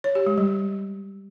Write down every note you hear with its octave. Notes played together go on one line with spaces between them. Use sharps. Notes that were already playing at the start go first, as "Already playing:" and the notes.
C#5
G4
G#3
G3